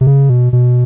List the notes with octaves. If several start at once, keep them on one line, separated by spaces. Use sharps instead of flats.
C3
C#3
B2
B2